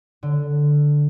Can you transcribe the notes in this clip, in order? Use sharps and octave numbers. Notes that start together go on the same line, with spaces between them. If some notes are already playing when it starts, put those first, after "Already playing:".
D3